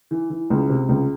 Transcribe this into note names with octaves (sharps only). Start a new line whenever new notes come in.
E3
E3
C#2
C3
C#2